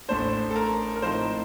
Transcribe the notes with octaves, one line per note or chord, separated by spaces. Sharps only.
A1 A2 A3 D4 C5
A4
A#4
A#4
A2 F3 C4 D#4 C5